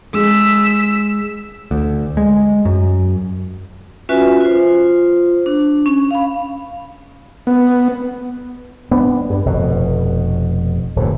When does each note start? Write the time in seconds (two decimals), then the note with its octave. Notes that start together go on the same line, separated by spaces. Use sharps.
0.14 G#3 E6 B6
1.71 D2
2.17 G#3
2.65 F#2
4.09 C#4 F4 F#4 B4 E5 G#5
4.41 F4 C5
5.46 D4
5.86 C#4
6.11 F5 B5
7.47 B3
8.91 B3 D4
9.30 G2
9.46 F1 B2
10.96 D1 F#2 A2